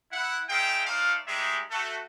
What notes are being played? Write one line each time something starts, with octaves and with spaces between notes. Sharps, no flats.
E4 F#5
D#4 G#4 C5 E5 F5 G5
A3 D#4 C5 D5 F5
G3 G#3 D#4 G4 G#4 E5
A3 F#4 A4